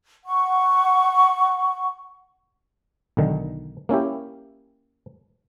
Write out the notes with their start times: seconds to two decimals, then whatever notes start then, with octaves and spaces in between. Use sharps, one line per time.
0.25 F#5 C#6
3.17 B1 D3 D#3
3.89 A#3 C#4 E4 G4